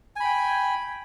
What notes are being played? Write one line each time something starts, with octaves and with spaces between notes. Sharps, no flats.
G5 G#5 B5